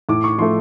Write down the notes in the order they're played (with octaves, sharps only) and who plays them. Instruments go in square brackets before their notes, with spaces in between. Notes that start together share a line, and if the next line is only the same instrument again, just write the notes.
[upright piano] A2 D6
C#6
F3 A3 C6